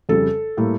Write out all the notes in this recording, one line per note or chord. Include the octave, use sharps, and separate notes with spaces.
F2 C#3 G3 A4
A2 G3 A#3